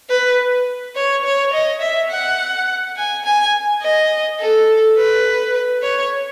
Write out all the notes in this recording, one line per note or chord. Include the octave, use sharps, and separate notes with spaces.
B4
C#5
C#5
D#5
E5
F#5
G#5
G#5
D#5
A4
B4
C#5